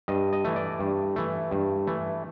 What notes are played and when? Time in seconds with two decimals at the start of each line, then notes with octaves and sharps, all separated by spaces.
0.08 G2 D#5
0.33 D#5
0.45 E3 A3
0.56 D5
0.80 G2
1.16 E3 A3
1.51 G2
1.87 E3 A3